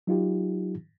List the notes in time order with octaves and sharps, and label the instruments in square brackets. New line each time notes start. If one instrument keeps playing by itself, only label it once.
[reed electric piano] F#3 D#4 F4 G4